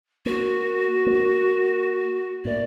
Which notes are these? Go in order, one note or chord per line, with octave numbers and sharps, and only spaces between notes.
A#3 F#4
A#3
A2 A#3 D5